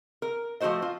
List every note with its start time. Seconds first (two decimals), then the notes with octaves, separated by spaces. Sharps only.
0.22 A#4
0.60 F3 A3 E4 F#4 C5 D#5
0.82 F4